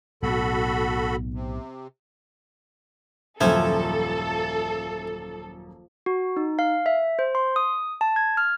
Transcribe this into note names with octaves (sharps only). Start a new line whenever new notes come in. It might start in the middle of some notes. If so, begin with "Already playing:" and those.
B1 A2 F#4 A4 B5
C3
D#1 F#2 F3 E4 A4 E5 G#5
F#4
D#4
F5
E5
C5
C6
D#6
A5
G#6
F6